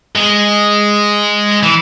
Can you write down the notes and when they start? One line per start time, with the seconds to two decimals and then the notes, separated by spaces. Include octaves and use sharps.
0.16 G#3
1.63 E3